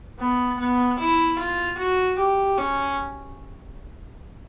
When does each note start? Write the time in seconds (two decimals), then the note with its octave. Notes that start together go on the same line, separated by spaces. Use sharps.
0.19 B3
0.59 B3
0.99 E4
1.39 F4
1.78 F#4
2.19 G4
2.58 C#4